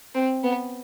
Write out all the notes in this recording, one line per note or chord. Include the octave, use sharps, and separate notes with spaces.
C4
B3